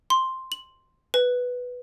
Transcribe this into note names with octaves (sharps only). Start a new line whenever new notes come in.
C6
F#7
B4